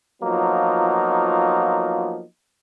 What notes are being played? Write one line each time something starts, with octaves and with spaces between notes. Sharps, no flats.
F3 F#3 A#3 B3 D#4 F4